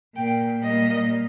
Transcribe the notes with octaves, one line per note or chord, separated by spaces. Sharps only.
A#2 A#3 G5
A#2 G3 A#3 D#5